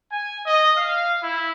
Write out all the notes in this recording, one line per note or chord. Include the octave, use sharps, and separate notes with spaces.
G#5
D#5
F5
E4